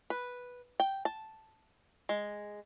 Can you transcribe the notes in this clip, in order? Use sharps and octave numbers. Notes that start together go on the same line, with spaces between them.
B4
G5
A5
G#3